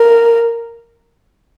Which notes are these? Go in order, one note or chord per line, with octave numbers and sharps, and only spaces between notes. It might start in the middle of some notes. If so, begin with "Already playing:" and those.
Already playing: A#4